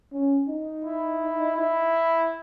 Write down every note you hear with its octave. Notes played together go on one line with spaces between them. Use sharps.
C#4
D#4
E4
E4